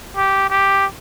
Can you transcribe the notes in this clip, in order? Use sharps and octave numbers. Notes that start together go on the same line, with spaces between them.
G4
G4